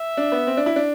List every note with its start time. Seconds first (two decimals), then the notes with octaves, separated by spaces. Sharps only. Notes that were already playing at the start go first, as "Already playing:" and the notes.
Already playing: E5
0.17 D4
0.32 B3
0.47 C4
0.57 D4
0.66 E4
0.76 D4